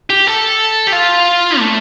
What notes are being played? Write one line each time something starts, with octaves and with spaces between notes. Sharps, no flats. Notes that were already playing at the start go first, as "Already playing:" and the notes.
G4
A4
G4
F4
A3